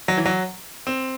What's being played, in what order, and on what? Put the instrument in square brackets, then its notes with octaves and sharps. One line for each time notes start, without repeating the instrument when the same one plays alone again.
[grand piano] F#3
E3
F#3
C4